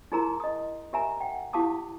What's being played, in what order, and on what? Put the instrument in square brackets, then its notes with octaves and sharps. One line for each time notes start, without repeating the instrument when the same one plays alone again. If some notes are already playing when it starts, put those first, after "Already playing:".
[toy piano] D#4 E4 G#4 A#4 A#5 C6
D#5 D#6
G4 A#4 E5 G#5 A#5
F#5 G5
E4 G4 F5 A5 D6 D#6